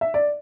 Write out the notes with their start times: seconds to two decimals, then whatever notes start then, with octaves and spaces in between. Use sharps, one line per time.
0.01 E5
0.14 D5